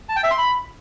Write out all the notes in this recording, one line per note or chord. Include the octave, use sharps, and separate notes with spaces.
A5
G5
E5
C6
B5